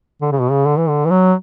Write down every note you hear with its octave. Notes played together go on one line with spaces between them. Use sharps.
D3
C#3
B2
C#3
D3
E3
D3
E3
F#3